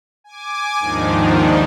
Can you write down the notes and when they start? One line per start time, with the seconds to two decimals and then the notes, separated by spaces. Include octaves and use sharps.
0.24 G#5 D6
0.79 D#2 G#2 D#3 F3 D4 D#4